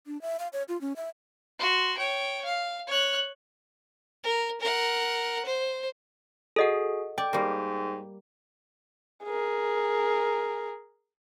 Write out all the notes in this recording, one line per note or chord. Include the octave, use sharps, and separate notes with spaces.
D4
E5
F5
C#5
F4
C#4
E5
F#4 C6
C#5 G5
F5
C#5 F#6
A#4
A#4 F#5
C5
F#4 G#4 A4 D#5 F#5
D5 G5
G#2 G3 A#3
G#4 A#4